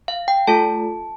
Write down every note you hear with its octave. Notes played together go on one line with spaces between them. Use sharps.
F5
G5
A3 F4 A4 A5